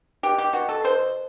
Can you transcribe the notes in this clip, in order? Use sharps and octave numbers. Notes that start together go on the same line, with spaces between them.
B2 G4
G4
B2 F#4
A4
B2 C5